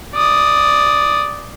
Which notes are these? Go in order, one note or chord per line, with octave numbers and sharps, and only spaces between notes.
D5 D#6